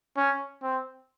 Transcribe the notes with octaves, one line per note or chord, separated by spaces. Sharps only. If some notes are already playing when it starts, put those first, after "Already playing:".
C#4
C4